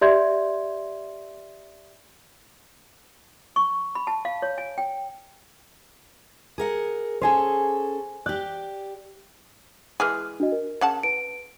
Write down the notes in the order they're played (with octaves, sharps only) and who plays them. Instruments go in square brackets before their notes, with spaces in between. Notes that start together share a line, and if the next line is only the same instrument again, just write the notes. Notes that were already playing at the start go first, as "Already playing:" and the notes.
[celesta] G4 D5 E5 C6 G6 G#6
[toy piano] C#6
B5
A5
F5
C#5
G#5
G5
[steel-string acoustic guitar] G#4 A#4 F#5
[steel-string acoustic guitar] C#4 G#4 A4 [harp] C5 G#5
[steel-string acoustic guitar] G4 D5 [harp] F#6 G6
[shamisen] E3 G#3 G#4 [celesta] F6 F#6
[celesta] D4 F#4 D#5
A#4
[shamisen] C#3 F#5 A5
[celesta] B4 D7